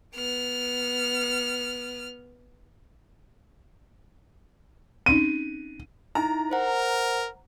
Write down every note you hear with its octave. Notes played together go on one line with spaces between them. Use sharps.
B3 F6
C4 C#4 D#4 D#7
D#4 E4 A#5
A#4 C5 F#5